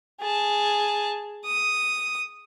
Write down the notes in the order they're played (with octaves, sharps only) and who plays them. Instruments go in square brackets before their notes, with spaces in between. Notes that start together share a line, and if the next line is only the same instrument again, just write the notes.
[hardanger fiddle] G#4 A5
D#6